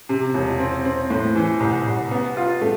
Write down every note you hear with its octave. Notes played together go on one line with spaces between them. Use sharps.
C3
E1
C4
C4
A2
E3
C2
C2
B3
F4
A3